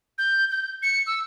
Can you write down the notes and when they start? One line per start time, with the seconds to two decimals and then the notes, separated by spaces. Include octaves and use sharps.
0.18 G6
0.51 G6
0.83 C#7
1.07 E6